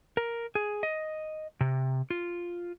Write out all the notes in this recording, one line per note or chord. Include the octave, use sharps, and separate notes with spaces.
A#4
G#4
D#5
C3
F4